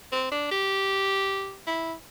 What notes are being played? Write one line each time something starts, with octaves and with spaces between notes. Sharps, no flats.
C4
D4
G4
E4